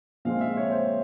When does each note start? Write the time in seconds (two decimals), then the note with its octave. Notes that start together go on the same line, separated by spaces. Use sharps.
0.25 A#2 F3 G#3 C4 F5
0.41 E5
0.57 C#5
0.71 C5